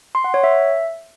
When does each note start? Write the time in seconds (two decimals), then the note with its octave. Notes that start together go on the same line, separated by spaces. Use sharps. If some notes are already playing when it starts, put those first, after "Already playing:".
0.15 C6
0.24 F#5
0.34 C#5
0.44 E5